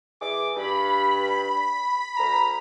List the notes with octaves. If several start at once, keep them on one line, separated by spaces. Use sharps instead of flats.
E3 G#4 D6
G2 B5
D2 A#5